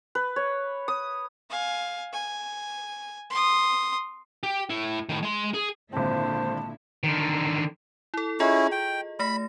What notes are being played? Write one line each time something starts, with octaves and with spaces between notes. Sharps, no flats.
B4
C#5
D#6
F5 G#5
G#5
C6 D#6
G4
A2 E4
A2 D#3
G#3 C6
G#4
G#1 A#2 D3 C4 E4 C5 A5
D3 D#3
E4 A4
C#4 E4 F4 G#4 D#5
G5
A3 B5 A#6